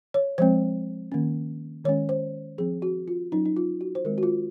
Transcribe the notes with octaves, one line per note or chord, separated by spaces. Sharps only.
C#5
F3 G#3 C4 C5
D#3 A#3 C#4
D#3 G#3 C#4 C#5
C5
F3 C4 G#4
F#4
F4
F#3 C#4 D#4
D#4
F4
F#4
C5
D#3 G#3 C4 A#4
F#4
F4